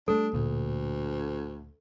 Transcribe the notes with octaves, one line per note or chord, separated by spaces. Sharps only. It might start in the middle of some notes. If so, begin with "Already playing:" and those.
G3 A3 D4 A4
D1 D2 A#2 D3